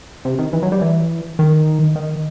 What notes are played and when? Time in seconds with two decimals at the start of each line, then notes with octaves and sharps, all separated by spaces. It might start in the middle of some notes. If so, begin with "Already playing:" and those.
0.25 C3
0.38 D#3
0.53 E3
0.63 F#3
0.72 G3
0.81 E3
1.39 D#3
1.96 D#3